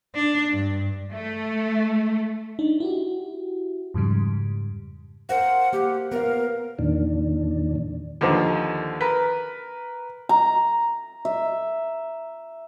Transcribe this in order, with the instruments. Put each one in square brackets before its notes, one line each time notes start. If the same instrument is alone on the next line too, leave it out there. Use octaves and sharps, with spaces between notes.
[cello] D4
G2
[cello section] A3
[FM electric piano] D4 D#4
E4 F#4 G4
F2 G#2 C#3 G3
[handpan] A#4 C5 F5 [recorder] F#5
[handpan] A#3 F#5 [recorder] G4
[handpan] B3 F5 [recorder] A#4
[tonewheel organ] E2 A#2 D#3 D4
[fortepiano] D#2 D3 F3
A#4 B4
[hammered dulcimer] A#5
E5